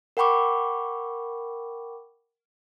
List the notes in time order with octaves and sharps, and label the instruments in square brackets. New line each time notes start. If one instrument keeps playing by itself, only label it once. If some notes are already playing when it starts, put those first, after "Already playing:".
[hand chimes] A#4 F#5 G5 B5 C#6 D6